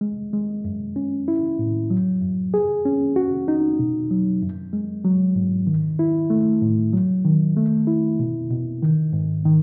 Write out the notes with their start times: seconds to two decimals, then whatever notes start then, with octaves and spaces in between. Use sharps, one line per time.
0.01 G#3
0.33 G#3
0.65 F#2
0.96 C#4
1.28 E4
1.59 A2
1.90 F#3
2.21 F#2
2.54 G#4
2.85 C#4
3.16 F#4
3.48 D#4
3.79 B2
4.11 F#3
4.42 F#2
4.73 G#3
5.04 F#3
5.35 G#2
5.67 D#3
5.99 E4
6.30 A3
6.62 A2
6.93 F#3
7.25 D#3
7.57 A3
7.87 E4
8.20 B2
8.51 B2
8.82 D#3
9.13 G#2
9.45 D#3